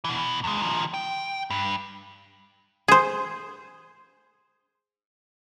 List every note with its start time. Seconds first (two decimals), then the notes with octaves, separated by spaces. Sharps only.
0.04 B2 E3
0.44 E2 G#3
0.62 D#3 F3
0.94 G5
1.50 G2
2.88 G#4 C5